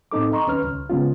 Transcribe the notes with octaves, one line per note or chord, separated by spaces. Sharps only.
A2 C4 D#4 A4 D6
D#5 A#5 C6 C#6
D#2 C#4 B4 F6
C#2
C#3 G#3 B3 C#4 F4